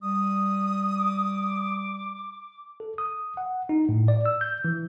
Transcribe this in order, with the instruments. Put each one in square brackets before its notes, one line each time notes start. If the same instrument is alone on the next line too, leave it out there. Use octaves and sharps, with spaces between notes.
[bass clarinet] G3 [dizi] D#6
[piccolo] D6
[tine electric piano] A4
D#6
F#5
D#4
A2
D5
E6
G6
E3